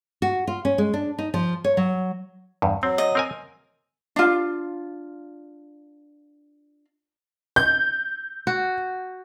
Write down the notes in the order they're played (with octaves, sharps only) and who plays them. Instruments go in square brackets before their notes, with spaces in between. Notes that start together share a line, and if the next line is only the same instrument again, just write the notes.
[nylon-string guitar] F#4
F4
C#4
G#3
D4
D#4
F3
C#5
F#3
[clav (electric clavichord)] E2 G2
[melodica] F#3 [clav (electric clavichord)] C4
[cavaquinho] D#5
[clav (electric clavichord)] C4 A#4 G#5
[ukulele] D4 F4
[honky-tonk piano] G6
[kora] F#4